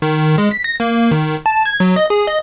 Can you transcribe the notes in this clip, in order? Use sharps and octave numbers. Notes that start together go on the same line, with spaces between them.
D#3
G#3
B6
A#6
A#3
D#3
A5
G#6
F#3
D#5
G#4
D#5